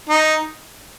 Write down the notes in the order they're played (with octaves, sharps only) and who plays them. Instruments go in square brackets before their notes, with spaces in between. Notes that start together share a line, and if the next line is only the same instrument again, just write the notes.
[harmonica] D#4